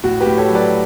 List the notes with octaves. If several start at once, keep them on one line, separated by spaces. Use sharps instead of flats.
A2 F#4
G4 B4
A2
A4 C#5
F#3
B4 D5